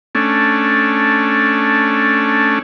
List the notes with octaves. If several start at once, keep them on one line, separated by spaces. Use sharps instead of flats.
A3 C#4 D4